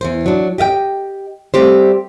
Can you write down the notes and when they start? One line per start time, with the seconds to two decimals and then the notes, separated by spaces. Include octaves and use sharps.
0.01 E2 G2 C5
0.26 F#3 D4
0.58 G4 D#5 F5 G5
1.54 G3 A3 C4 G4 C5